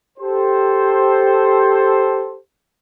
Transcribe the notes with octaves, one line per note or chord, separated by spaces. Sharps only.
G4 A4 C5